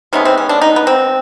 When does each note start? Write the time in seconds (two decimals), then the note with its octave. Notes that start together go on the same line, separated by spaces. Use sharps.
0.13 C3 D#3 G#3 B3 C#4
0.25 C4
0.37 C#4
0.49 D4
0.62 D#4
0.76 B3
0.87 C4